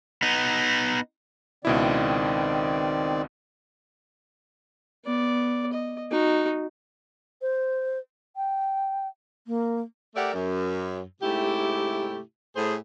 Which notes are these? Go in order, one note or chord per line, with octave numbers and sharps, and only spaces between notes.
B3 D#4
C#2 B2 D#3 C4 E4 D5
B3 D5
D#5
D#4 F#4
C5
G5
A#3
A3 G4 A#4 D5 E5 F#5
F#2
G#2 C3 A3 E4 G4
A2 G#4 C5